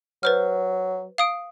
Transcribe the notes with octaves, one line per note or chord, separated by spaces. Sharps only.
F#3 B4 C5 F6
F5 D#6 D7